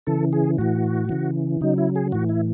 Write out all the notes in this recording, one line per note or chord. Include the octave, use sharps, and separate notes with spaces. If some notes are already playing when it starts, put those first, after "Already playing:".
C#3 E3 A4
G#4
A2 E3 F#4
C#3 E3
C#3 F#3 D#4
E4
G#4
A2 E3 F#4
E4